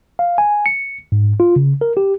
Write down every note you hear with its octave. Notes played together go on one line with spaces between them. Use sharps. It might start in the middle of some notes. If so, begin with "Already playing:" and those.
F5
G#5
C#7
G#2
F4
C#3
A#4
G4